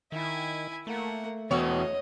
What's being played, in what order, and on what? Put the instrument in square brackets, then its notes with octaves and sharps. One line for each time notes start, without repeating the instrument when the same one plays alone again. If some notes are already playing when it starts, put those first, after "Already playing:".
[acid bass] D#3 [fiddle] E4 G#5
[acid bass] A3 [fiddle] A#3 F#5
[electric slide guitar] E2 B3 F#4 [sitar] C#5 [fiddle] D#5